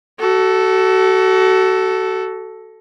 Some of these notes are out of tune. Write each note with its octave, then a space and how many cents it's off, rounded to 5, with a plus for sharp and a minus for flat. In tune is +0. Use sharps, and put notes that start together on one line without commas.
F#4 +30 A4 +0